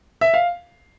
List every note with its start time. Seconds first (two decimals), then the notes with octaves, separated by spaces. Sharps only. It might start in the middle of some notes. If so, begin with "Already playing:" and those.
0.21 E5
0.34 F5